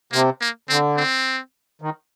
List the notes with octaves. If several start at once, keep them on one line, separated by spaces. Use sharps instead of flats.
C3 A#3
A#3
D3 C4
C4
D#3